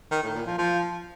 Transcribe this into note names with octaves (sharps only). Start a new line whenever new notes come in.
D#3
A2
A#2
F3
F3